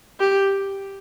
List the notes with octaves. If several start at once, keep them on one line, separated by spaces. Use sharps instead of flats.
G4